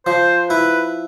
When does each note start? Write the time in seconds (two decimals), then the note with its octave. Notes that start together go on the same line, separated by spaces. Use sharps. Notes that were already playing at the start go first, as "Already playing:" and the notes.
0.06 F3 C5
0.49 E4 B4